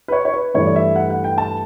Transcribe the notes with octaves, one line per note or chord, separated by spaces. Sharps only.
B4
C#5
C#5
B4
G2 E3 A3 E4 C#5
D5
E5
F#5
F#5
G5
A5